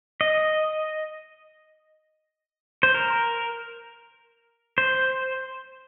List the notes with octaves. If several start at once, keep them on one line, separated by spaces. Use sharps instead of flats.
D#5
C5
A#4
C5